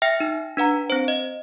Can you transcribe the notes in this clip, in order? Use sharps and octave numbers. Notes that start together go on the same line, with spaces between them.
E5 G5 F6 A#6 C#7
D#4
D4 B4 F#5 A#5
C4 C5
D#5